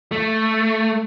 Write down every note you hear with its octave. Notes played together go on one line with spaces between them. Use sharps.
A3